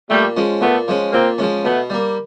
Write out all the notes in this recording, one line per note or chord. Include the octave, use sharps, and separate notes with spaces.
A#2 G3 A3
F3 G#3 C#4
A#2 A3 B3
F3 G#3 C#4
A#2 A#3 C4
F3 G#3 C#4
B2 A3 B3
G3 A#3